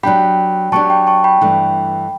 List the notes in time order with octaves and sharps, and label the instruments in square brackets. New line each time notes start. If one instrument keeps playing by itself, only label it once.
[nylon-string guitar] F#3 B3 D4 G4 [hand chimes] G5 B5
[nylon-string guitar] F#3 B3 D4 G4 [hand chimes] A5 C#6
[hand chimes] G5 B5
A5 C#6
G5 B5
[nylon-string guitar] G2 E3 A3 D4